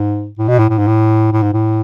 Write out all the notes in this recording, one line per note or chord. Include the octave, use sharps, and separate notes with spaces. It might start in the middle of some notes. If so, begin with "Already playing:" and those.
Already playing: G#2
A2
B2
A2
A2
G#2
A2
A2
G#2
A2